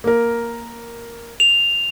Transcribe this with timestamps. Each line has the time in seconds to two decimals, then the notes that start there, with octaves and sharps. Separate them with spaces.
0.04 A#3 A#4
1.40 F7